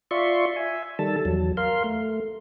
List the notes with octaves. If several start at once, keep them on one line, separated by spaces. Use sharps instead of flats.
F4 D5 E5 C6 C#6
E5 G#5
D#3 G3 A4 A5
E2 F#3
A#4 F5 C6
A3